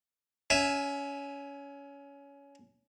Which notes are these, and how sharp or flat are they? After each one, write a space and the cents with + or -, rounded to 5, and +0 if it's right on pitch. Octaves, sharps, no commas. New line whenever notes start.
C#4 +20 E5 +0 G#5 -5